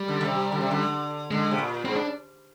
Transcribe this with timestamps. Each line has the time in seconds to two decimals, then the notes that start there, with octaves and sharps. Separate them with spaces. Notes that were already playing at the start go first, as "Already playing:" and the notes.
Already playing: G3
0.08 D3
0.21 D3
0.25 C3
0.52 D3
0.61 C3
0.71 D3
1.31 D3 G#3
1.51 C3
1.58 A#2
1.85 G#2 C4
1.96 D4